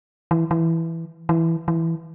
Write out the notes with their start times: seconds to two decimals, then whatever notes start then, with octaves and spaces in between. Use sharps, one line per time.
0.31 E3
0.51 E3
1.29 E3
1.68 E3